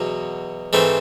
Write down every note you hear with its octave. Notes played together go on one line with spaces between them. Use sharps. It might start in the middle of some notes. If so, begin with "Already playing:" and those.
Already playing: E2 B2 F#3
G#2 E3 A3 C4